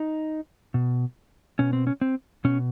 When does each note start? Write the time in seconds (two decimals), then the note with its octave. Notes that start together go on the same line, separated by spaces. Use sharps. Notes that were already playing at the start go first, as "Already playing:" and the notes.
Already playing: D#4
0.74 B2
1.59 B2 C#4
1.73 C4
1.87 C#4
2.01 C4
2.45 B2 C#4